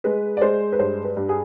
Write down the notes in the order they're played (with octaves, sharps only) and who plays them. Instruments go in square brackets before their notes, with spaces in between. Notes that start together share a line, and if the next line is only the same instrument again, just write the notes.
[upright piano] G#3 B4
D5
G#3 C5
B4
G2 C5
B4
G2
G#4